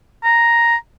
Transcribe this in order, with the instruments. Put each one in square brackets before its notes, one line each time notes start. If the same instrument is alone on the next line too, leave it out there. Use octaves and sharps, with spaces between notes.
[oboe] A#5